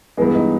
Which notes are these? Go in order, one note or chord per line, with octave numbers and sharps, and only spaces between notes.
G2 E3 G#3 B3
D#4